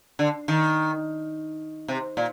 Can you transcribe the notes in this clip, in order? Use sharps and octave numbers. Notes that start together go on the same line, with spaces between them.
D3
D#3
C3
A#2